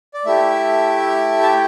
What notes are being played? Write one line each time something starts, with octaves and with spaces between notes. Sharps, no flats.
D5
A3 E4 G4 E5
A5
G5